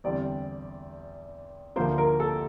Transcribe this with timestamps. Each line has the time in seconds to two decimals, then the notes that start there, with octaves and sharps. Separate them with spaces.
0.04 E2 D3 G3 C4 D5
1.76 D2 D3 F3 A#3 C5
1.98 A#4
2.20 A4